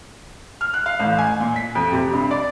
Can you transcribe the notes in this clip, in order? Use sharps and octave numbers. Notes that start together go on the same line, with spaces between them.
F6
F#6
F5
A1
G#5
A#2
B6
F2
C3
G2
D5